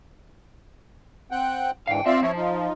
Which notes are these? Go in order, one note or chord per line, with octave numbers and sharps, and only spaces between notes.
C4 F#5 G5
G#2 D3 E3 F5 G5
C4 F4 D5 E5
F3 E4 C#5
D#4 F4